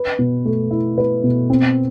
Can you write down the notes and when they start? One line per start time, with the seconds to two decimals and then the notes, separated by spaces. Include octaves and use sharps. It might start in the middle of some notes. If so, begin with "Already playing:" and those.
Already playing: B4
0.19 B2
0.45 A3
0.71 E4
0.98 B4
1.23 B2
1.50 C4